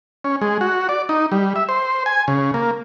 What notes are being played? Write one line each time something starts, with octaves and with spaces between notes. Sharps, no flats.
C#4
G#3
F#4
D5
D#4
G3
E5
C5
G#5
C#3
A#3